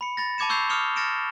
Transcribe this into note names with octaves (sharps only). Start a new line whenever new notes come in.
B5 C#7
B5 A6 A#6
A5 B5 D6 G#6 C#7 E7
C#6 E6 G6 G#6 C7 F7
D6 D#6 F6 C#7 F7 G7
F6 A6 A#6 C#7 D7 E7